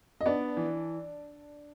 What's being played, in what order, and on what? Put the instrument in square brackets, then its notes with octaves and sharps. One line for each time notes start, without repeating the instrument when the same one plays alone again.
[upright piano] D#5
[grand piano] B3 [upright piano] D4 D5
[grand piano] E3